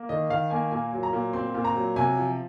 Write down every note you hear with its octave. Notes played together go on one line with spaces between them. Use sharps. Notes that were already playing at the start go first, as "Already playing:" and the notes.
Already playing: A#3
D#3 D#5
D#3 F5
A#3 G#5
A#2 G#5
F#3
A#5
A#2
C4 C6
A#2
A#5
F#3
C3 G#5
F3